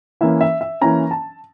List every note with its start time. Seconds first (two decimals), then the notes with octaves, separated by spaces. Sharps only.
0.21 E3 A#3 C#4 E5
0.41 E5
0.61 E5
0.81 E3 A#3 C#4 A#5
1.11 A5